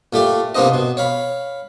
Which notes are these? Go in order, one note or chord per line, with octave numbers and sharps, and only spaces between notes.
A#2 A3 G4 D5
C3 A#3 B3 D4 C5 D#5
B2
C#5 F5 B5